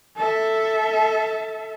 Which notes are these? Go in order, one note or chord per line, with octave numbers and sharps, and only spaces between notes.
A4 E5